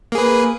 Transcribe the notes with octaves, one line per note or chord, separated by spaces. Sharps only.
A#3 G#4 B4